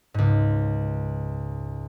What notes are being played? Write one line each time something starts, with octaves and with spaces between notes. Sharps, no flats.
C#2 G#2